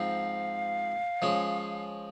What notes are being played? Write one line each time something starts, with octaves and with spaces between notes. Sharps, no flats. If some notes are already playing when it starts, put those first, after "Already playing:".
Already playing: G#2 F3 C4 F5
F3 G#3 C#4